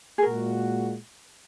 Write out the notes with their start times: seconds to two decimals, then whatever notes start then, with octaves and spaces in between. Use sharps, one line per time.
0.18 G#4
0.22 A#2 G#3 F#4 A#4